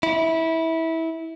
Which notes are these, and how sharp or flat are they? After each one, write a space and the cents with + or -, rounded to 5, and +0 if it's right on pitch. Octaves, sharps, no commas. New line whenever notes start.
E4 -20